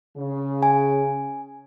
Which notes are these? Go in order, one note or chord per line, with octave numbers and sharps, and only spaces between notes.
C#3
G#5